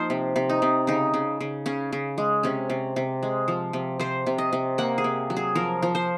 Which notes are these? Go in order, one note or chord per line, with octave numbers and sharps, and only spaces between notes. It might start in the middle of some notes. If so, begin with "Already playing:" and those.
Already playing: F3 A#3 D#4 F4 C5
C3
C3
D#4
C3
C#3 D#4
C#3
C#3
C#3 C#4
C#3
G#3
C3 C#4
C3
C3
G#3
F3
C3
C3 C5
C3
D#5
C3
A#3 F#5
G#4
C3
F#3
G#4
F3 A#4
F3
C5